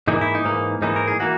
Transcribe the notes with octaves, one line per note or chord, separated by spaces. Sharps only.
G#2 E3 A#3 D#4
E4
D#4
G#2 E3 A#3
G#2 E3 A#3 D#4
A#4
G#4
E3 A#3 F#4